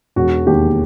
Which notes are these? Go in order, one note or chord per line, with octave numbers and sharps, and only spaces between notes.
E1 F#4
D#2 G4